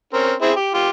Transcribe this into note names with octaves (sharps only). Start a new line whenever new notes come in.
C4 C#4 A#4
C4 E4 G#4
G4
F4 G4